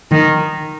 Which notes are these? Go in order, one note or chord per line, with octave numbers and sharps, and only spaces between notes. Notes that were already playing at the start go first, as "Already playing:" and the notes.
D#3